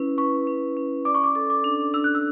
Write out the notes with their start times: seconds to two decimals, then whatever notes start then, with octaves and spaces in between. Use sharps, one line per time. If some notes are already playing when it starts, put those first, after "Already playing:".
Already playing: C#4 E4 B4
0.18 B4 C#6
0.47 C#4
0.77 C#4
1.05 D5 D6
1.15 C#6
1.24 D6
1.35 A4
1.50 D6
1.64 D4
1.94 D4 E6
2.04 F#6
2.15 E6